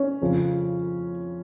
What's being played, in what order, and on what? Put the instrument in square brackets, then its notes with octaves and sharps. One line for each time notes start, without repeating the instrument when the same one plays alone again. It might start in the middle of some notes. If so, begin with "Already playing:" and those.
Already playing: [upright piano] C#4
[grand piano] F2 C#3 F3